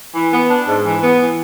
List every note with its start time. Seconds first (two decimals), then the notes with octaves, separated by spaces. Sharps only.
0.14 E3
0.32 B3
0.49 D4
0.67 G#2
0.85 E3
1.03 B3
1.20 E3